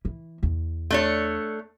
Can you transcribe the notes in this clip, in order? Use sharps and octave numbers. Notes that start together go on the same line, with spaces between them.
E3
E2
A3 D4 C#5